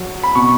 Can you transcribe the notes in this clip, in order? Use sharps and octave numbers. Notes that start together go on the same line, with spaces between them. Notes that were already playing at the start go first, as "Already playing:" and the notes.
Already playing: F#3
B5
B2 C#6